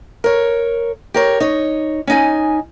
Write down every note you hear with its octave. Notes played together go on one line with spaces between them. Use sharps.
A#4 C#5
G4 A#4 C#5
D#4 C#5
C#4 D#4 G#5